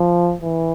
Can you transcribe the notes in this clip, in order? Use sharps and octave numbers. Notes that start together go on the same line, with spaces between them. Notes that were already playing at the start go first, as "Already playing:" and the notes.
Already playing: F3
E3